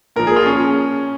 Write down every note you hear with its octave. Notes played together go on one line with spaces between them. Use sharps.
A#2 F3 A#4
G#4
F4
C#4